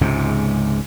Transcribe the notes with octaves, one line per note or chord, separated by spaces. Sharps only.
C#2 G#2 C3